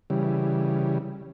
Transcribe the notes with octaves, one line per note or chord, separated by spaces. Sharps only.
C#3 E3 G3